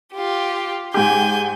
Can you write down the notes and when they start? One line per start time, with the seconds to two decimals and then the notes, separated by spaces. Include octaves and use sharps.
0.13 F4 G4
0.94 G#2 G4 G#5 G6